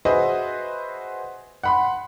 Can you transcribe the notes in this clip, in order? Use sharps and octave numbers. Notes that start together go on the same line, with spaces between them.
F#4 G#4 B4 C5 D#5 E5
F#5 B5 C6